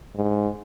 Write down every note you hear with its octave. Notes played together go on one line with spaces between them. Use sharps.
G#2